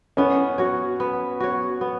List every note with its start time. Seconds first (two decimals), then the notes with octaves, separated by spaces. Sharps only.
0.17 B3 C#4
0.58 F#4 C#5
1.00 B3
1.40 F#4 C#5
1.81 B3